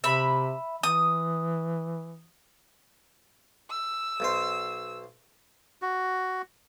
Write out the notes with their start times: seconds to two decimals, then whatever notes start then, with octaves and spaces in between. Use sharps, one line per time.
0.04 C3 E5 B5
0.83 E3 D#6
3.70 E6
4.20 B1 B2 C5
5.82 F#4